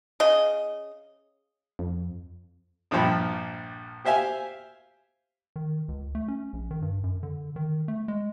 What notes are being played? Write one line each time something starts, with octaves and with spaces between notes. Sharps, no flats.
C#3 D#5
F2
A#1 G2 A#2 F3 G5 B5
G4 C5 E5 F5 G#5
D#3
C#2
A3
C#4
A#1
D#3
G2
F#2
D3
D#3
A3
G#3